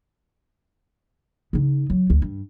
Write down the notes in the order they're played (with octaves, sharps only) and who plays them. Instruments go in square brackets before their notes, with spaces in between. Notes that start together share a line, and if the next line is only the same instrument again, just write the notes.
[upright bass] C#3 D#4
F#3
D2
G2